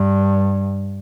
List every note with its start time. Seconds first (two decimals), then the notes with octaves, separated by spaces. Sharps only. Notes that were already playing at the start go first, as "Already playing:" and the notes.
Already playing: G2